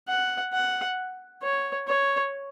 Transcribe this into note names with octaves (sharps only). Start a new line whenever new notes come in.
F#5
F#5
C#5
C#5